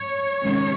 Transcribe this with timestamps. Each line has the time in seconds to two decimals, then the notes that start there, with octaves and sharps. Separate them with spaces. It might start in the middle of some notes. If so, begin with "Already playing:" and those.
Already playing: C#5
0.41 C3 D#3 G#3 C#4